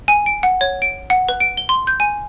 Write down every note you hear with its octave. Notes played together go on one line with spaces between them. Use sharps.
G#5
D7
F#5
C#5
D7
F#5
B4
D7
G7
C6
G6
G#5